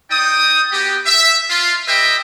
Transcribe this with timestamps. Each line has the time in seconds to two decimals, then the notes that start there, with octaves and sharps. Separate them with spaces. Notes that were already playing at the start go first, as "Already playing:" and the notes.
0.11 D#4 D5 G5 D#6
0.72 B3 F#4 G4
1.06 E5
1.50 F4
1.88 G4 B4 D#5 E5 G5